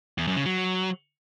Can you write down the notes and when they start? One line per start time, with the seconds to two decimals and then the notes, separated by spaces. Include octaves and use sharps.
0.18 E2
0.27 F#2
0.37 C#3
0.46 F#3